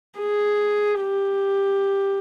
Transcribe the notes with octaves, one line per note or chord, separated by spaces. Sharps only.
G#4
G4